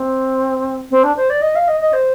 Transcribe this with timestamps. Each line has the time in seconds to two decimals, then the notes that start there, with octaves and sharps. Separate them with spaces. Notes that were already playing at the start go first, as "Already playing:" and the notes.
Already playing: C4
0.91 C4
1.04 D4
1.17 C5
1.30 D5
1.42 D#5
1.55 F5
1.68 D#5
1.80 D#5
1.93 C5